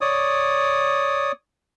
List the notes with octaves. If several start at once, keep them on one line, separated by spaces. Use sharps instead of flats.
C#5 D5 D#6